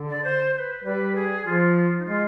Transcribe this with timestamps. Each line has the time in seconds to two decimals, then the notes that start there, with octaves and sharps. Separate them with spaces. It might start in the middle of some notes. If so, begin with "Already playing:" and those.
Already playing: D3
0.10 D5
0.24 C5
0.54 C5
0.59 B4
0.84 G3 B4
1.15 G#4
1.45 F3 F4
1.98 D#4
2.06 G#3 F4